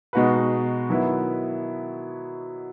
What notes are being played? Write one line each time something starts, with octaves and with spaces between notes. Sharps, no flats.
B2 G#3 D#4 F#4 B4
D#3 F#3 B3 E4 B4